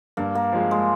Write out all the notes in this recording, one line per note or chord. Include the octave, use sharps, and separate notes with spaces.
G2 A#3
A#3
F3 G#3
G#3